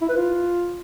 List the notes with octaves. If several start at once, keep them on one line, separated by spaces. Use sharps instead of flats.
E4
B4
F4